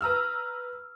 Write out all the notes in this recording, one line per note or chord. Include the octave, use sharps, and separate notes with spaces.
B4 A#5 E6 F6